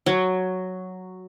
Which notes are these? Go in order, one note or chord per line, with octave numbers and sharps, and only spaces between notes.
F#3